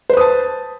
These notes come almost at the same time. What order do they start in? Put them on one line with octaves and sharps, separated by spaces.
C5 B4 D#6 A5